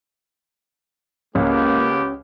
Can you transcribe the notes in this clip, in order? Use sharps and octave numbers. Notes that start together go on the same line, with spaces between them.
C#2 G#3 A#3 B3 C#4 G4 C#5